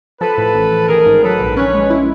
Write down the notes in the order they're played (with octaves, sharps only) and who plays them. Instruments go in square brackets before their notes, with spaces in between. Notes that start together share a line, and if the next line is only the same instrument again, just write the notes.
[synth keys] F3 [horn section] A4 B4
[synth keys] A2
A1
A1
[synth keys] D#3 [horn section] G#4 A#4
[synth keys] G#2
[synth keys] F#3 [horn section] A4 B4
[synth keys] A#1
[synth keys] C#4 [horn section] B4 C#5
[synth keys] G#3
E4